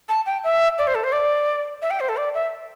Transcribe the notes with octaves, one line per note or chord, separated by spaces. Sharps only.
A5
G5
E5
D5
C5
A4
C5
D5
E5
G5
C5
A4
D5
E5